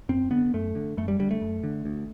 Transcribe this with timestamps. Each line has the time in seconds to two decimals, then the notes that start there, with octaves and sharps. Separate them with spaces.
0.09 F#2 C4
0.31 D3 B3
0.54 F#2 A3
0.75 D3
0.97 F#2 A3
1.08 G3
1.19 D3 G3
1.31 A3
1.42 F#2
1.64 D3
1.85 D2